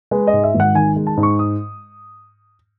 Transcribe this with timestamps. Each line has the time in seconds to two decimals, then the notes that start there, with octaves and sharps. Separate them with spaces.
0.11 G#3 B4
0.27 D#5
0.33 G#2
0.44 E5
0.54 G#1
0.60 F#5
0.75 D#3 G#5
0.96 G#3
1.07 A5
1.17 G#2
1.23 C#6
1.39 D#6